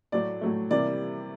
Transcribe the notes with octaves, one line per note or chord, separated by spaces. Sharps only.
A2 F#3 A3 D5
A2 F#3 A3
C3 E3 G3 A#3 D5